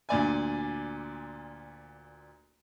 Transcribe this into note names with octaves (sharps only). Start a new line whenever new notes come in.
D2 A#2 D5 G#5